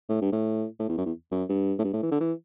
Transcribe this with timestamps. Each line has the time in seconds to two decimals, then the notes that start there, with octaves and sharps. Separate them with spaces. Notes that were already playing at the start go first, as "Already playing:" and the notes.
0.09 A2
0.22 G2
0.33 A2
0.80 A2
0.89 E2
0.98 F#2
1.06 E2
1.32 F#2
1.49 G2
1.79 A2
1.84 G2
1.93 A2
2.03 E3
2.12 D3
2.20 E3